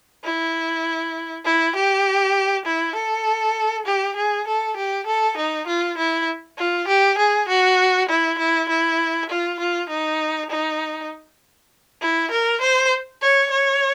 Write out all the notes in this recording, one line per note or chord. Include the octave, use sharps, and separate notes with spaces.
E4
E4
G4
E4
A4
G4
G#4
A4
G4
A4
D#4
F4
E4
F4
G4
G#4
F#4
E4
E4
E4
F4
F4
D#4
D#4
E4
A#4
C5
C#5
C#5